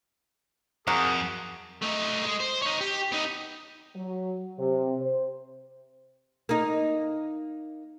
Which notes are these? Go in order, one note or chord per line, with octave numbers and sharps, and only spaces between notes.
F2 A#3 F#4 G#4 A#4 D#6
A3 D#4
G#3
C5
D#4 C#5
G4
B3 D#4
F#3
C3
C5
A#3 D#4